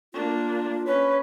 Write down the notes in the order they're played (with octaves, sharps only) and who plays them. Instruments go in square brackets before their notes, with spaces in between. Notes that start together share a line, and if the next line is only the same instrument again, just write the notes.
[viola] A#3 D4 [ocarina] F4
[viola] C#4 B4 [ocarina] C#5